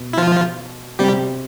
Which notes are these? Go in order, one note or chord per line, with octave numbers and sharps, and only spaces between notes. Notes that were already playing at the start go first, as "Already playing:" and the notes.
Already playing: B2
E4
F3 F4
C3 G3 C4 G4